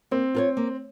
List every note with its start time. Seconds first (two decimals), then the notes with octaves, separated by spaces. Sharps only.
0.11 A#3 C4
0.35 F4 A#4 C#5
0.57 A#3